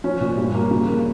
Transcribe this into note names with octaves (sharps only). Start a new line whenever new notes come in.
F3 C#4
A#2
G2
A#3
C#3
A#3